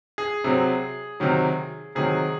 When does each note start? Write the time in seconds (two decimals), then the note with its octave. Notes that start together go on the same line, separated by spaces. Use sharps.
0.18 G#4
0.44 C3 F#3 C4
1.20 C3 D#3 F#3
1.95 C3 D#3 F#3 G#4